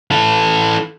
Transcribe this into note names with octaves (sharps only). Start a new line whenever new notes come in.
E3 A4